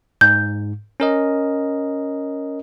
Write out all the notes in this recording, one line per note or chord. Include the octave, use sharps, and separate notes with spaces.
G#2 G6
C#4 A#4 D#5